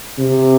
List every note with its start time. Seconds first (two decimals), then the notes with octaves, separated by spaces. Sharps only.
0.19 C3